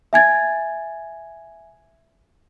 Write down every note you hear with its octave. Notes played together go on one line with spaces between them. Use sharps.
E5 G#5 G#6 A6